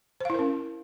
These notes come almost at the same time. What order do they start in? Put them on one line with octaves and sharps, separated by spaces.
C5 F5 E4 A#4 C#4